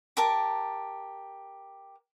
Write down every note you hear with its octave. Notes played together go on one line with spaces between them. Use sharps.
G4 A#4 A5